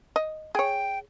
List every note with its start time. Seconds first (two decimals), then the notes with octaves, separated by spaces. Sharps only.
0.16 D#5
0.55 G#4 C#5 G5